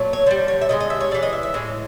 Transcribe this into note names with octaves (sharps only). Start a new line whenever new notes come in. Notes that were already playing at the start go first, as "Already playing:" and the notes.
Already playing: A#2 F#3 A3
C#5
D3 G3 C5
C#5
E5
D3 F3 G#3 D#5
D#5
E5
C#5
C#3 E3 G#3 D5
D#5
E5
E5
A2 E3 G#3